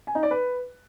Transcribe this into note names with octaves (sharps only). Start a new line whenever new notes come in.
G#5
D#4
D5
B4